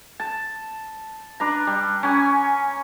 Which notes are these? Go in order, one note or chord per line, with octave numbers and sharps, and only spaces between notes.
A5
D4 B4 A#5
G3
C#4 G#5